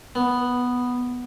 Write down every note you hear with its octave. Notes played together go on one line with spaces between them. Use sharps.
B3